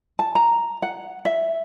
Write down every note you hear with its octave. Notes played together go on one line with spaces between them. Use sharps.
A5
A#5
F#5
E5